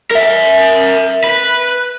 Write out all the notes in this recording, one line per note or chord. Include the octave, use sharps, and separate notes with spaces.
A#4 E5
B4